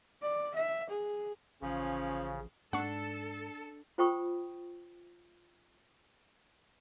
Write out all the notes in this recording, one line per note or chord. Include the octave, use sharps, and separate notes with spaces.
D5
E5
G#4
A1 C#3 F3 C#4
G#2 D4 A4 F#5 C#6
F4 C5 G5 B5 C#6 D#6